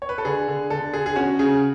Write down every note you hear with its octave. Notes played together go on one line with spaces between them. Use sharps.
C#5
B4
A4
D3 G#4
D3
D3 A4
D3 G#4
G#4
C#4 F#4
C#3 G#4